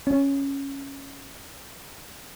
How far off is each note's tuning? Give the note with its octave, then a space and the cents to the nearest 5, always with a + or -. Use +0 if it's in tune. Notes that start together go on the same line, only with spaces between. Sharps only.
C#4 -5